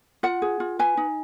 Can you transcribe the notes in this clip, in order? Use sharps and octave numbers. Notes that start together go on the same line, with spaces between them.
F4 F#5
G#4
F4
B4 G#5
D#4